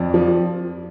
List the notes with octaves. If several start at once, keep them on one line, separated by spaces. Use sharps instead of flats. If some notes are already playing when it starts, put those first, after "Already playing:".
Already playing: F2 D5
F3